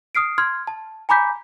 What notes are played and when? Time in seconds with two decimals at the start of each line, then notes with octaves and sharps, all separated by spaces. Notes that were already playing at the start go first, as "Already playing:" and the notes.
0.15 D#6 F6 C7 D7
0.38 C6 F6 G#6
0.67 A5
1.09 G#5 A#5 B5 D6 G6 B6